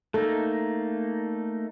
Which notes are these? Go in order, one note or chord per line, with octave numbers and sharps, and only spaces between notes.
A3 A#3 D#4 A4